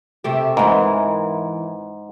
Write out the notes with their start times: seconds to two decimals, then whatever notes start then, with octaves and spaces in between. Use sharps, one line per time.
0.24 C3 A3 G4
0.57 G#2 E3 A#4